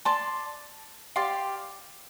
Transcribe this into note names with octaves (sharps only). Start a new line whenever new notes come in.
D5 A5 C6
G4 D5 F5 C6